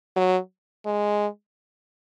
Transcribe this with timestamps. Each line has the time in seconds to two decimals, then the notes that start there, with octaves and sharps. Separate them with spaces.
0.16 F#3
0.86 G#3